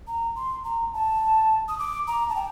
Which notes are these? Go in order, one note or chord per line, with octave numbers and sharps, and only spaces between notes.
A#5
C6
A#5
A5
D#6
D6
A#5
A5
G5